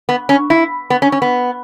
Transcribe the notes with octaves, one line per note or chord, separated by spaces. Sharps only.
B3
C#4
E4
B3
C#4
C#4
B3